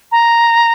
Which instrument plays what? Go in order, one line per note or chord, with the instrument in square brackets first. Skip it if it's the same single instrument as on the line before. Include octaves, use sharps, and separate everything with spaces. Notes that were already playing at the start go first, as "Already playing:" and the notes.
[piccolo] A#5